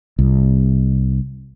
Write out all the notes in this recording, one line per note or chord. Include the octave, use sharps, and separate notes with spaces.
C2